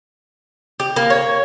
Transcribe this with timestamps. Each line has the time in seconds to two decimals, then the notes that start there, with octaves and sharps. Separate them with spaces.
0.80 G4
0.96 A#3
1.10 C#5